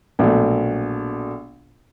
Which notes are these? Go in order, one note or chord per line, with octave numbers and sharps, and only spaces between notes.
A#1 B2 F#3 A3